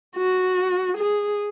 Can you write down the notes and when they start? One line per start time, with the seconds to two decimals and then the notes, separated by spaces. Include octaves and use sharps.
0.16 F#4
0.97 G#4